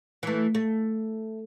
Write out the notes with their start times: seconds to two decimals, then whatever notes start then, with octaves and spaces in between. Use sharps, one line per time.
0.23 E3 A3
0.55 A3